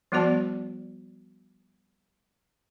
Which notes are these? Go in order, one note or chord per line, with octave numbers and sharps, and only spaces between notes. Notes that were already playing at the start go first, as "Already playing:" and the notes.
F3 G3 B3 F#4 D5 A5